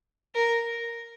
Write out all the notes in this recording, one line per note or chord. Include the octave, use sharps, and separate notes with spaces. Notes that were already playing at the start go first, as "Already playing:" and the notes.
A#4